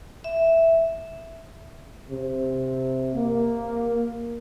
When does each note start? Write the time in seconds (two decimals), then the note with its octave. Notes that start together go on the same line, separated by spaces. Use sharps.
0.24 E5
2.10 C3
3.14 A#3